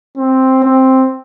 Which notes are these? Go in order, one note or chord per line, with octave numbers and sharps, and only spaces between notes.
C4
C4